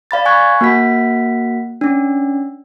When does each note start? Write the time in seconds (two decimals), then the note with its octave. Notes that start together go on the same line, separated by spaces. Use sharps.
0.11 D5 F5 B5 A6
0.25 G#5 B5 C#6 F#6 G#6
0.61 A#3 F#4 F#5 B6
1.81 C#4 D4